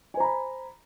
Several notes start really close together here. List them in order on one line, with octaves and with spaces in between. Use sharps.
G#5 C5 A#5 B5